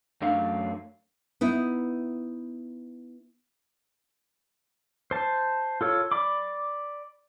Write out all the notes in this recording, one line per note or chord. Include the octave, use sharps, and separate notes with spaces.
F#2 F#3 A3 D4 F5
B3 D#4 E4
C5 A5
F4 A4 C#5
D5 B5 D6